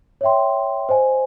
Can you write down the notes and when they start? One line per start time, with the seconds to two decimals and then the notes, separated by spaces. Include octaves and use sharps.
0.21 C#5 E5 G5 C6
0.89 C5 D#5 G#5